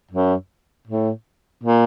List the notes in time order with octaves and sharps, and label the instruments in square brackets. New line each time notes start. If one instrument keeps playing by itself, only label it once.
[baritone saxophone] F#2
A2
A#2